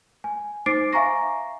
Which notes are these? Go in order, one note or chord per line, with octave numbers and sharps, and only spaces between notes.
G#5
D#4 C5 D6 A6 C7 D7
E5 F5 G#5 A#5 C#6 A#6